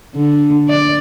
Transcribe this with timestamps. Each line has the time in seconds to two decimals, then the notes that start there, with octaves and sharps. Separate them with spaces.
0.15 D3
0.69 D5